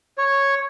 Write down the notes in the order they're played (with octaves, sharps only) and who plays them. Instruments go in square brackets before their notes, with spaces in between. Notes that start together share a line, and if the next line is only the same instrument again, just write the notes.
[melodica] C#5